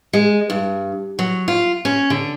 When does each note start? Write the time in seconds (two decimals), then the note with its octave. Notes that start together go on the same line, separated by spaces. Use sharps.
0.13 G#3
0.50 G2
1.19 F#3
1.48 F4
1.85 C#4
2.10 D3